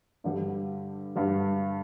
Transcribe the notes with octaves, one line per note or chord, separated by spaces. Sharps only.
G2 D3 G3
G2 D3 G3